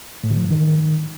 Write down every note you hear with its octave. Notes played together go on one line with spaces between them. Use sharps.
A2
D3
F3
G2
D#3